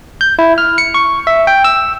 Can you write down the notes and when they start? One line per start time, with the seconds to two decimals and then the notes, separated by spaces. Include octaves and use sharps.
0.21 G6
0.39 E4
0.58 F6
0.78 C#7
0.94 C#6
1.27 E5
1.47 G5
1.64 E6